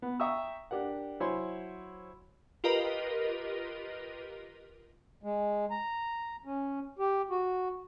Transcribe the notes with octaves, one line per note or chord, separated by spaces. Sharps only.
B3
E5 G5 A#5 C#6 D#6 E6
D4 G4 A#4 F#5
F#3 E4 C5 C#5 G#5 C6
F4 G4 A#4 B4 D#5
G#3
A#5
C#4
G4
F#4